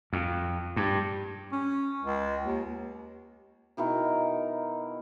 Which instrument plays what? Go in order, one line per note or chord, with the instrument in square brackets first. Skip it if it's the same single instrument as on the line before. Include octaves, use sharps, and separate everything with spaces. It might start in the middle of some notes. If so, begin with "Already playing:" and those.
[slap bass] F2
G2
[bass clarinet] C#4
C#2
D#2
[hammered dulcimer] B2 D#3 E4 A#4